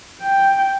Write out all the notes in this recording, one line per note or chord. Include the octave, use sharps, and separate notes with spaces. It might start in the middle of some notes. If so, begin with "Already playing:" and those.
G5